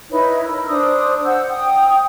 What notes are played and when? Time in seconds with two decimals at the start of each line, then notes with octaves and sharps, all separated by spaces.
0.11 D#4 E4 B4 C#5
0.42 A#4 E6
0.68 D4 C5 D#6
1.24 C5 F#5 E6 G6
1.48 G5 D#6